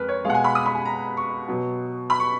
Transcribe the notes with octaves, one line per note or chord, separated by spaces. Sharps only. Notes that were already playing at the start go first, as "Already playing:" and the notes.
Already playing: F2 G#3 A#4 B4
C#5
B2 G#3 F5 F#5
G#5
B5
D#6
B5
G#5
A#5
C#6
B2 F#3
B5
C#6